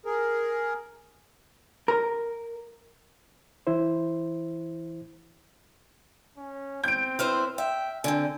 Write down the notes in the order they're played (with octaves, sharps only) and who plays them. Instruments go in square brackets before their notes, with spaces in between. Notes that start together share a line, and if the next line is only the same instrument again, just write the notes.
[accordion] G#4 A#4
[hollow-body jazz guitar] A#4
[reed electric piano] E3 E4 C5
[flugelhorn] C#4
[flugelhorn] C4 [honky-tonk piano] G6 D7
[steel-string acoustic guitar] E4 B4 C5 [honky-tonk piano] F6
[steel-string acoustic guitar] E5 [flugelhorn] G5
[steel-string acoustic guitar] D3 C4 [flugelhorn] G#5